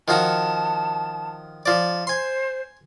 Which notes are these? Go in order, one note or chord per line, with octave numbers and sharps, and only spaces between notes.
D#3 F3 F#4 A5
F3 D5
C5 G#5 C6